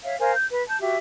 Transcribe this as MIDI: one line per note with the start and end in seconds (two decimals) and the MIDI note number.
0.04 0.17 73
0.04 0.17 76
0.04 0.17 77
0.19 0.34 70
0.19 0.34 72
0.19 0.34 77
0.19 0.34 80
0.34 0.45 91
0.51 0.61 71
0.67 0.77 81
0.67 0.77 91
0.81 0.96 66
0.81 0.96 67
0.81 0.96 76